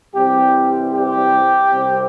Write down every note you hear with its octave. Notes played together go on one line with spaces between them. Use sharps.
C2 C3 E3 G3 C4 G4
G4
C2 C3 G3 C4